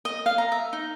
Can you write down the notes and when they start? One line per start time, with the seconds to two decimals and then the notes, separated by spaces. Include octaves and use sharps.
0.05 D#5
0.26 F5
0.38 A#5
0.52 E5
0.73 D#4